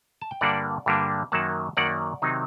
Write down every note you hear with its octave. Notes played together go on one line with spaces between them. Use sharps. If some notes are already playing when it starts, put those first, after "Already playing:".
A5
G5
G2 D3 G3 A#3 D4 D5 F#5
G2 D3 G3 A#3 D4
F#2 D#3 F#3 A#3 F#5 A5
F#2 D#3 F#3 A#3 D5 F#5
C3 D#3 F#3 C4 D#4